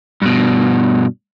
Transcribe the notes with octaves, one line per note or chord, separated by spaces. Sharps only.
G2 B2